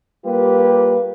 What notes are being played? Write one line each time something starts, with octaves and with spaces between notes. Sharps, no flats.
G3 A#3 F4 G4 B4